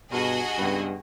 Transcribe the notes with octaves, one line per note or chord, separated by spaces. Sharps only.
G2 B2 F#4 G#4 D#5
C#2 G2 B3 B4